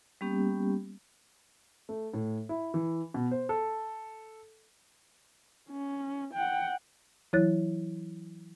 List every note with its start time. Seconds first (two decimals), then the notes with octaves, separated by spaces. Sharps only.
0.21 G3 A#3 B3 C#4 G4
1.89 A3
2.14 A2
2.49 E4
2.74 E3
3.14 B2
3.31 C5
3.49 A4
5.70 C#4
6.34 F#5 G5
7.33 E3 F#3 E4 C#5 F#6 A6